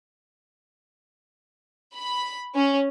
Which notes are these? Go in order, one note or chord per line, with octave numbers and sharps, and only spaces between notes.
B5
C#4